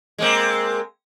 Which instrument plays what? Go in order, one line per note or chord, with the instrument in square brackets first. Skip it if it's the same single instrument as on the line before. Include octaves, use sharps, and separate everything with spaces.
[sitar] G#3 A#3 C4